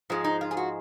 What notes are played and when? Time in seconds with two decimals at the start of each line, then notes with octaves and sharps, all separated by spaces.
0.10 G#2 F3 G#3
0.24 D#4
0.41 F4
0.51 G#4
0.57 F#4